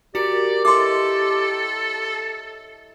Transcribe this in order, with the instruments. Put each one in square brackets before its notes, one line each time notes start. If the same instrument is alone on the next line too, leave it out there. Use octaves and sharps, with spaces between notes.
[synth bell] F#4 C#7 [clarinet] G4 [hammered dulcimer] A#4 [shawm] D5
[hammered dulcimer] E4 C#5 D#5 [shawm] A4 [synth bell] C6 D6